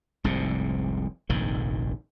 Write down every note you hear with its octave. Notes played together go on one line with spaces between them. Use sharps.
F1 C2 G#2 C3
F1 A#1 G2 D#3